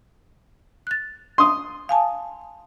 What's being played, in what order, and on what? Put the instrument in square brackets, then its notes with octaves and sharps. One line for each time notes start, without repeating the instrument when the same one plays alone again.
[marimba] F#6 A6
[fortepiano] C6 D#6
[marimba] F5 G#5 A5